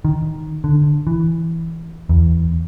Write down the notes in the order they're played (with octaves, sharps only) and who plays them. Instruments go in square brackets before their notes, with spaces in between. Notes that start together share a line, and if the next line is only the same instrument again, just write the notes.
[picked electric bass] D#3
D3
E3
E2